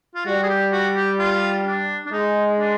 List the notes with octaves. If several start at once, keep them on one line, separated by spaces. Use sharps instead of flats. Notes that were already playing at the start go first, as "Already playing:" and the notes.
F4
G3 F#4
G#4
G4
F#4
G4
F4
D4
D4
G#3 D#4
D4